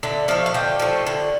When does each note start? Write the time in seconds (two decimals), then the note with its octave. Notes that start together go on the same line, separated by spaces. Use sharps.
0.03 D3 E5
0.28 F3 A3 F5
0.46 F5
0.54 D3 G5
0.80 F3 A3
1.07 D3